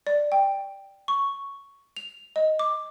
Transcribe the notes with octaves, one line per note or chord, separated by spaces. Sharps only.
D5
G5
C#6
F7
D#5
D6